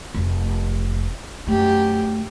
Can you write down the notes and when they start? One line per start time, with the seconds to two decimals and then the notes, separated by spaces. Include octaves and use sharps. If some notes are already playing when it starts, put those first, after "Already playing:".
0.14 F1
1.47 F#2 A3 G4